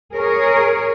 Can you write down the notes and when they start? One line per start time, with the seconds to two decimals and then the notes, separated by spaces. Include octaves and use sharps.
0.14 G#4 A#4 C#5